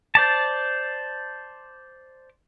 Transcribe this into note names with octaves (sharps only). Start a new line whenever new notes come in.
C5 D5 A5